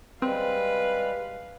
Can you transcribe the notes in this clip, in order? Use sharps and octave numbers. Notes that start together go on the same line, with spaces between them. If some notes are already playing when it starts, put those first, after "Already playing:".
G3 G#3 C4 B4 F5